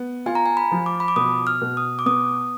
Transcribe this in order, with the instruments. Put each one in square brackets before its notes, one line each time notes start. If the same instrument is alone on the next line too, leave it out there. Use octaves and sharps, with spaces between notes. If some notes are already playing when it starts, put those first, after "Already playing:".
Already playing: [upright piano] B3
[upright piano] F4 [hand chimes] G#5
[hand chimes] A#5
G#5
B5
[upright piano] F3
[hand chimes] D6
B5
D6
[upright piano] B2 [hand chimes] D#6
[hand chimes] F6
[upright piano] B2
[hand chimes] D#6
D6
[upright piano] B3 [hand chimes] D#6